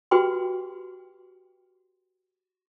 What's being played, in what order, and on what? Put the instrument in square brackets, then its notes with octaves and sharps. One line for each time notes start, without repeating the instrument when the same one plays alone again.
[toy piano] F#4 G4 B4 G5 C6